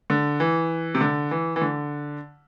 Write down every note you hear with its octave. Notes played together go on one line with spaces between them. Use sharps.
D3
E3
C3
D3
E3
E3
D3